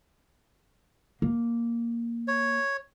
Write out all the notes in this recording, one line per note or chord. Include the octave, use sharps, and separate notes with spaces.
A#3
C#5